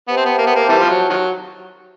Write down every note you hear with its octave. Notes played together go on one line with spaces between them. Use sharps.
B3 G4 C5 E5 A5
C4
B3
A#3
B3
A#3
C3 E3 G3
F3
F#3
D#3 F#3